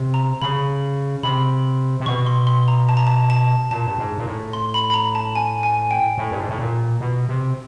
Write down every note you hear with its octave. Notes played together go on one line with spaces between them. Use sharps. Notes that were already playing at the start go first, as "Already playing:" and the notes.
Already playing: C3
A#5
C#3 B5
C3 B5
C3
B2 C#6
C6
C6
A#5
A5
A#5
A5
A5
A#2 A5
G2
G#2
A#2
A2
C6
B5
B5
A#5
A5
G#5
G#5
G5
A2
G2
G#2
A2
A#2
B2
C3